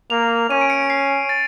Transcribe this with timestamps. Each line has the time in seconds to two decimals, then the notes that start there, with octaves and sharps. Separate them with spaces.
0.10 A#3 F7
0.50 C#4 D#7
0.61 D7
0.70 C#7
0.90 C7
1.29 A6